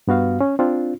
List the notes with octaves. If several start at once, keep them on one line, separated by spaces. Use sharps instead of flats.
G2 B3 F#4 F5
C#4
C4 D4 F4